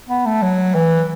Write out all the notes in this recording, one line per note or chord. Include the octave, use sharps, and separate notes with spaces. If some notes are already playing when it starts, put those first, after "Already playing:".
B3
A3
F#3
E3